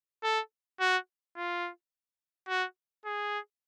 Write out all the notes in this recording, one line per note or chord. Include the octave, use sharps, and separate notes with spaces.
A4
F#4
F4
F#4
G#4